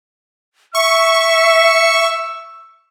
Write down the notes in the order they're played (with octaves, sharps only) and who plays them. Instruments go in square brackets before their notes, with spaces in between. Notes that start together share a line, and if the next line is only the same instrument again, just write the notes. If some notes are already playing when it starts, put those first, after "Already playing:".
[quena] E5 [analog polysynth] C#6 [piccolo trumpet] E6